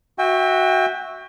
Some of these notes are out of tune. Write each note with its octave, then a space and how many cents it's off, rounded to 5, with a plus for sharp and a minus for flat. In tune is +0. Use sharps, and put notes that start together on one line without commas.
F#4 +0 E5 -10 G5 +30